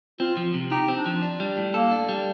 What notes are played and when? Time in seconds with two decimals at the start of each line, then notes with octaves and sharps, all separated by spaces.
0.20 C4 F4
0.37 F3
0.54 C3
0.71 D#4 G4
0.88 C4
0.98 D4
1.06 F3
1.22 D4
1.40 G3
1.57 A2
1.74 A#3 A4
1.91 D4
2.09 G3